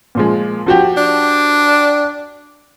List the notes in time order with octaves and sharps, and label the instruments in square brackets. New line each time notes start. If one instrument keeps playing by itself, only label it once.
[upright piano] A#2 F3 G#3
F3 F#4 G4
[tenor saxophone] D4